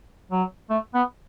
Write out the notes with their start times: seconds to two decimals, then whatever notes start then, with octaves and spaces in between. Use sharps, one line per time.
0.32 F#3
0.70 A3
0.94 B3